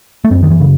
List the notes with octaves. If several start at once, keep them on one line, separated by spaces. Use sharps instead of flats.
A3
F#2 C4
D#3
E3
C#3